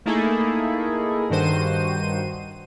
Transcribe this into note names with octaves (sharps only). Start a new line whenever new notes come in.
A3 A#3 D#4 E4 G#4 A4
G2 D#3 F#4 C5 D#7